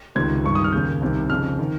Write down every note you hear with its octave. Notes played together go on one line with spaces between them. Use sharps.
C#2 C3 D#3 G#6
G2 D#3 C#6
D#6
F6
D#2 C#3 G6
C2 C3 D#3
F2 C#3 F6
D#3